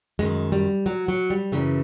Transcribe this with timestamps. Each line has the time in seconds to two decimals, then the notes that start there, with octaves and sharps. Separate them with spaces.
0.19 F#2 D#3 G#3
0.52 G3
0.86 F#3
1.08 F#3
1.30 G3
1.52 F#2 C#3 E3